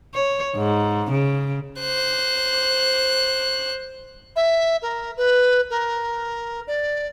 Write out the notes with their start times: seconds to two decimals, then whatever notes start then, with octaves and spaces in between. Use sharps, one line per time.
0.14 C#5
0.57 G#2
1.11 C#3
1.80 C5 F#6
4.36 E5
4.82 A#4
5.17 B4
5.70 A#4
6.67 D5